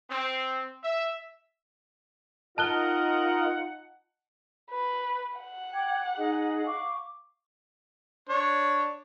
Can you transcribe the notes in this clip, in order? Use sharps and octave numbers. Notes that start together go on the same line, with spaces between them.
C4
E5
D#4 F4 A#4 D#5 F#5 A5 F#6 G7
B4
F#5
G5 D6 G#6
D#4 G#4 D#5
F5 C#6 D6
D4 C#5